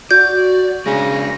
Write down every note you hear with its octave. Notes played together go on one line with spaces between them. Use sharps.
F#4 D5 G6
C#3 G#3 D4 A#6